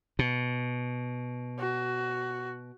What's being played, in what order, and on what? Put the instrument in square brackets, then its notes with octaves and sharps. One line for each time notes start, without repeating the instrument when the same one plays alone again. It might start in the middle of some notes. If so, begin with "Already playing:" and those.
[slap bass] B2
[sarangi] F#4